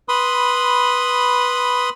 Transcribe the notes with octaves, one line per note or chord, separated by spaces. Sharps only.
B4 B5 C6 D#6